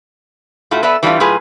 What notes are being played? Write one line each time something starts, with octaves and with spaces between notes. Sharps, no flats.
A2 A3 F4 F#4
B3 A4 B4 D5 E5
E3 G3 A3 A#3 D4 F4
A2 F#3 F4 G#4 B4 G#5